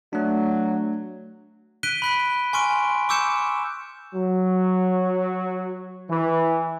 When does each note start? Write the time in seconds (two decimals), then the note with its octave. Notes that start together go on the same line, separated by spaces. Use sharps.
0.13 F#3 A3 D4
1.83 F#6 B6 D7 D#7 G7
2.02 B5 F#6 B6
2.53 G#5 C6 C#6 F6 D7
3.09 C#6 D6 E6 G6 C#7 E7
4.15 F#3
6.09 E3